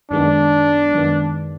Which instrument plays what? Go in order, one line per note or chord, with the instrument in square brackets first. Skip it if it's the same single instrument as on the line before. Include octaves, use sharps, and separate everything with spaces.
[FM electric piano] F#2 D#3 G#3 B3 [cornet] D4
[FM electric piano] F#2 D#3 G#3 B3